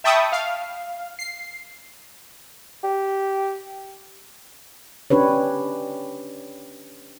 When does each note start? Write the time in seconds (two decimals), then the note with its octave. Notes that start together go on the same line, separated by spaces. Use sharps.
0.04 E5 G5 A5 B5 C#6 D#6
0.32 F5
1.19 C7
2.84 G4
5.10 C#4 D4 G4 B4 C#5